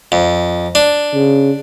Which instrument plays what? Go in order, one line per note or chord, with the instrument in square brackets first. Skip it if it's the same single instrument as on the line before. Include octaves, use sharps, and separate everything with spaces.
[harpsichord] F2
D4
[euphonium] C#3